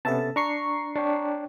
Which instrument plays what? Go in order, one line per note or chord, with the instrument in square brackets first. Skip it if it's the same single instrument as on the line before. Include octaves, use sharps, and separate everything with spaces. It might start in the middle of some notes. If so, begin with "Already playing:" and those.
[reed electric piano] C3 B3 C#4 [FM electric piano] A4 E5 A5
[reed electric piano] D4 [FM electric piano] A#5 C#6 C7
[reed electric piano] D4 C#5 G5